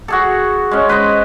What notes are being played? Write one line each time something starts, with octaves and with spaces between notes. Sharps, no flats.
F#4 G#4 A4
G#3 C#4
B4 C5 D#5